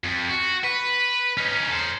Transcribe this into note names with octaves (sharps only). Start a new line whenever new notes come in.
F2
F#4
B4
C#4 D#4
A4 C5